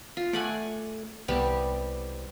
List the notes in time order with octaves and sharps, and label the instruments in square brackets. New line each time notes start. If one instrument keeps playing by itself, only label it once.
[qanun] F4
[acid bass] A3 [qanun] D5 F#5 G#5
[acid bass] C2 [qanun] G3 B3 G4